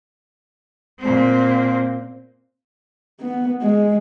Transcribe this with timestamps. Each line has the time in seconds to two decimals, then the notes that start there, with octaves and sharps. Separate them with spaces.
1.00 A#2 C4
3.20 B3
3.62 G#3